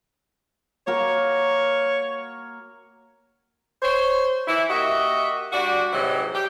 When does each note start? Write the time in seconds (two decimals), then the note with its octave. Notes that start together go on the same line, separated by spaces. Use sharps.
0.87 A#3 F#4 A#4 C#5
3.82 C5 C#5
4.47 E3 E4
4.69 A#3 F#4 G4 D#5 E5
5.52 G3 D4 F#4
5.93 G#2 C3 E3 F#3 D#5
6.35 G4